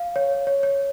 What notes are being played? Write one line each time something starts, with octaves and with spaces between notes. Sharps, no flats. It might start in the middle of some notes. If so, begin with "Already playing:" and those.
Already playing: F5
C#5
C#5
C#5